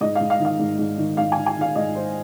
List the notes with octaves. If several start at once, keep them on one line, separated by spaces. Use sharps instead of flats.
G#2 D#5
G#2 F5
F5
D#3
F5
G#2
G#2
D#3
G#2 F5
G#5
D#3
G#5
D#3 F5
G#2 D#5
D#3 C5